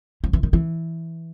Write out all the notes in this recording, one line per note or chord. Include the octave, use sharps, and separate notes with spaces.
F3
E3
D#3
E3